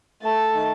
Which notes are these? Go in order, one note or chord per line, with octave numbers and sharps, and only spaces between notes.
A3 A5
D#3